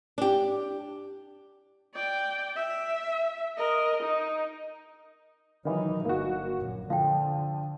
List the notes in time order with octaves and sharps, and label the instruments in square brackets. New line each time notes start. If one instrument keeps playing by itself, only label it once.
[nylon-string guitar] D4 G4
[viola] D5 G5
E5
A#4 D#5
D#4
[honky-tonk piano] D#3 E3 [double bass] F#3 D#4
[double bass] G1 [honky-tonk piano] A#3 F#4 [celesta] A#4
[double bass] A#1 F#2
[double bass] D3 [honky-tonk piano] F3 [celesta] F5 G5